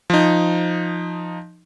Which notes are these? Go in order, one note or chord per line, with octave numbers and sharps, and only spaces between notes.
F3 D#4